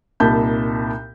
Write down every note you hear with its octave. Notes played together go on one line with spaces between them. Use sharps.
C2 A#2 D#4 A5 B5 G6